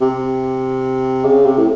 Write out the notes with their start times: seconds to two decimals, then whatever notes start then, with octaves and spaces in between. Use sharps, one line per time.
0.01 C3
1.25 C#3
1.46 C3
1.58 A2